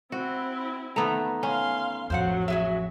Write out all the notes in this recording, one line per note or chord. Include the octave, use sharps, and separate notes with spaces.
C4 E4 F#4
E2 D#3 A3 B3 A#5
C#4 F5 C6
A1 F2 F#3 C5 F5 F#5
F#4 G#4 E5